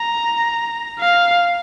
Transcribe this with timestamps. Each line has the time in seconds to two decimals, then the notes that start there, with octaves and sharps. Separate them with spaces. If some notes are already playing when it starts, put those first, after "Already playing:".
Already playing: A#5
1.00 F5